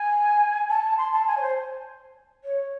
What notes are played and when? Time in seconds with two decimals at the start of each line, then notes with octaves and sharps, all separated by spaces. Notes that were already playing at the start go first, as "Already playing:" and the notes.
Already playing: G#5
0.69 A5
0.98 C6
1.12 A5
1.27 G#5
1.37 C#5
1.41 C5
2.44 C#5